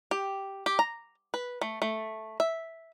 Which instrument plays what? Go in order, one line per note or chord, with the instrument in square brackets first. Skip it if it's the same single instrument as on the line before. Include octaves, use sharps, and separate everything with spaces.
[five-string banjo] G4
G4
A#5
B4
A3
A3
E5